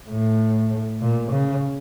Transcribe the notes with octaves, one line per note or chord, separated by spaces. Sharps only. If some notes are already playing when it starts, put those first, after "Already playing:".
A2
A#2
C#3